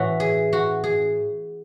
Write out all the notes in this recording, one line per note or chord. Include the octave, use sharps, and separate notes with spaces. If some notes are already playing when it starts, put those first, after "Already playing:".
Already playing: A2 E3 F#4
G#4
F#4
G#4